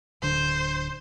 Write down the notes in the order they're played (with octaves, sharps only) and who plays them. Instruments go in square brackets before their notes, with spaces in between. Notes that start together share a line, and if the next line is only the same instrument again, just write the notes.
[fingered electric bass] D1 D3 D4 [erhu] C5